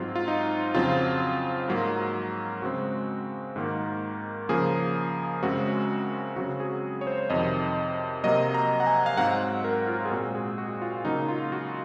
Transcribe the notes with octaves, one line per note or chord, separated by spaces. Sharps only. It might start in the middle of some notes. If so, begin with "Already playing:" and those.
Already playing: G#2 F#3 C4 F4
F4
D#4
F2 C#3 F#3 C4 F4
G#2 F#3 A#3
C#3 G#3 C4 F#4
G#2 D#3 A#3
C#3 F3 A#3 G#4
F#2 C#3 G#3 C4 F#4
C#3 F#3 C4 F#4
G#4
C#5
C5
F2 C3 D#3 D#5
C3 F#3 A#3 D#5
A#5
F#5
G#5
F5
G#2 F#3 C4 F#5
A#4
F4
G#4
A#2 G#3 C4 F#4
G#4
F#4
F4
C#3 F#3 A#3 D#4
F4
F#4